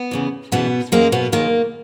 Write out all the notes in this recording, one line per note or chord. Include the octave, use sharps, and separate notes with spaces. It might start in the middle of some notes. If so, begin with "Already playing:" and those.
Already playing: B3
E2 C#3 E3
F#2 B2 E3 G#3 B3
F#2 E3 G#3 A#3
B2 B3
D#2 D#3 G#3 A#3